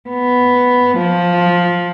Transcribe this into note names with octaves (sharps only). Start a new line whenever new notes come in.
B3
F3